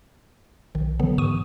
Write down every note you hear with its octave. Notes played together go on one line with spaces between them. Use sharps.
B1 D#3
D3 E3 F#3 B3
G#2 C3 D#3 C#6 D#6 D#7